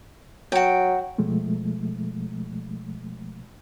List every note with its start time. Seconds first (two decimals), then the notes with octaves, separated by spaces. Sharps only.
0.52 F#3 F#4 G5
1.18 B2 F3 G#3 A3